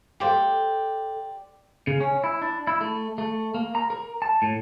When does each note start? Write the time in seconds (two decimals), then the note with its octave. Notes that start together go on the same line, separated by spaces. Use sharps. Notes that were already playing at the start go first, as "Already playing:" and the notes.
0.20 G4 A4 C5 D5 F5
1.87 C#3
2.00 C#4
2.24 E4
2.41 D4
2.67 E4
2.81 A3
3.18 A3
3.54 A#3
3.75 A#5
3.90 A#4
4.22 A5
4.42 A2